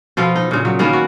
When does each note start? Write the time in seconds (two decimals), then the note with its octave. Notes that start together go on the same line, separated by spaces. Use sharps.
0.17 B2 F3 F4 A4
0.36 D#4
0.51 A#2 C#3
0.65 F#3
0.79 D#3 A#3 B3 C#4
0.93 F#4